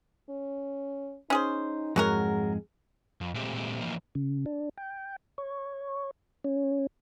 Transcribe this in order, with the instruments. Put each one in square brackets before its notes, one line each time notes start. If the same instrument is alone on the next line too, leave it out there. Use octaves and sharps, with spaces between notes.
[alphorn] C#4
[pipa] C#4 G#4 C5 [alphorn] D#4
[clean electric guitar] F2 G#2 G#3 [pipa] F#3 F#4 A#4 [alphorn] G#4
[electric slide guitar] F2
A#2 G#3 A3 C4 G4
E3 F3 A#3
[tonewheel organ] C#3
D4
G5
C#5
C#4